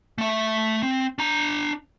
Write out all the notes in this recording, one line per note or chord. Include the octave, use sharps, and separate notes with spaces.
A3 E5
C4
D4 A#5